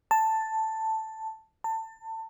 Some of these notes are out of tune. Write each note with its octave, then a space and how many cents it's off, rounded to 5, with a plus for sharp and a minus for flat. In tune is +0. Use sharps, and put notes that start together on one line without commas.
A5 +5
A5 +25